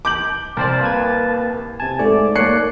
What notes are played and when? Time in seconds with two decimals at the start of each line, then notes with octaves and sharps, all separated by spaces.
0.05 D6 G6 F#7
0.57 C2 A#4 C5 D5 A5
0.81 A#3 B4 G#6
1.80 C3 G#5 A5
1.99 G#2 A3 D5
2.35 A#3 C#5 D5 F#6 C7 C#7